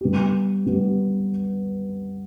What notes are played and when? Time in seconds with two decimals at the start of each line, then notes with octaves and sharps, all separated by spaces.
0.01 G3 B3 G4
0.66 G3 B3 G4